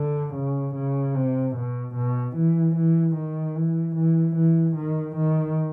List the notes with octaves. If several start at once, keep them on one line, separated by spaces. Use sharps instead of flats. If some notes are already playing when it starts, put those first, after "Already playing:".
Already playing: D3
C#3
C#3
C3
B2
B2
E3
E3
D#3
E3
E3
E3
D#3
D#3